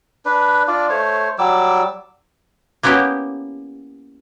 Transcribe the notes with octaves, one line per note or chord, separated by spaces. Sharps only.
D4 B4
D4 F4 D5
A3 C5 C#5
F#3 G3 D6 E6
A#3 B3 C#4 E4 G4